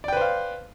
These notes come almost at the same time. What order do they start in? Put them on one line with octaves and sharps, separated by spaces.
D5 G5 B4 C5 F5